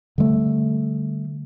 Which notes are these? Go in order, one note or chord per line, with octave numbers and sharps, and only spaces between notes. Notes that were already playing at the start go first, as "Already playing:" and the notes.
D3 G3 A3